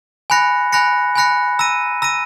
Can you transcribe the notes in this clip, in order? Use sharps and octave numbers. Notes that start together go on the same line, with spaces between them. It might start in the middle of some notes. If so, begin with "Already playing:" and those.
G#5 B5 F#6 A#6 C#7
G#5 B5 F#6 A#6 C#7
G#5 B5 F#6 A#6 C#7
A#5 E6 A#6 D#7
A#5 E6 A#6 D#7